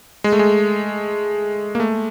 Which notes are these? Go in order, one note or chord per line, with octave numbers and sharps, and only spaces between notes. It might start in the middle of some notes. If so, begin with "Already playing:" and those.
G#3
A3
G#3
A#3
A3